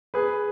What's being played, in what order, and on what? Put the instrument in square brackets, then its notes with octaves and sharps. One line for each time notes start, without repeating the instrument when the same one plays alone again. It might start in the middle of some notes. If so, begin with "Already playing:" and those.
[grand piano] G#4 B4